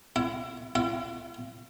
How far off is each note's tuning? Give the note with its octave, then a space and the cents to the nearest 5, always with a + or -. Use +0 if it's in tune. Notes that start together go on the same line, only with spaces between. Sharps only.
E4 +30
E4 +45